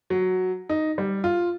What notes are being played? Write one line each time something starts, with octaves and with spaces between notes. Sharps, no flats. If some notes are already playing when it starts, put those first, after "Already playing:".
F#3
D#4
G3
F4